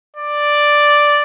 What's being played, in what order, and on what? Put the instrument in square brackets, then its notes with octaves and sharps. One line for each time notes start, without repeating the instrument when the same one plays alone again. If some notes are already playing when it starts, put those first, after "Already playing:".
[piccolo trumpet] D5